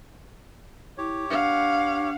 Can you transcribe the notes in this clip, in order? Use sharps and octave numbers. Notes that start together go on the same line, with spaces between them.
E4 G4 C#5
D4 F5 F#5